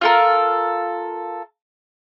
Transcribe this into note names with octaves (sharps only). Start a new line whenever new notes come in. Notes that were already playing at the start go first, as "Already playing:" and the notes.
F4 A4 A#4